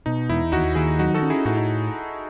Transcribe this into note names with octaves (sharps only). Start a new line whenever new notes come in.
B2 D#4
E2 E4
D#2 D#4 F#4
D#3 E4 G#4
F#3 D#4 F#4
F#4 A4
C#4
E4 G#4
A2 D#4 F#4
D#4